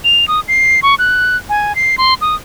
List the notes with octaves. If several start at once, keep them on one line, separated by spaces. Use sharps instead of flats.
F7
D#6
C7
C#6
F#6
G#5
C7
C6
D#6